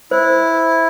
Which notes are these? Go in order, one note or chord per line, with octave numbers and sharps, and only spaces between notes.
E4 C5